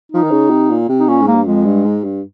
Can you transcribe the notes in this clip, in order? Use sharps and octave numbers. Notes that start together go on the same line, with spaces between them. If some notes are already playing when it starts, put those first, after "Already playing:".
F3 D#4
D#3
C#3
C3
A#2
C3
D#4
A#2 C#4
G#2
A#3
G2
F2 G#3
G2
G#2
G2